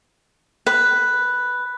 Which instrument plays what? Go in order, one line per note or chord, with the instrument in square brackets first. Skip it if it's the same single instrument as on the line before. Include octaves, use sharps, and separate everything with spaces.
[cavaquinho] B4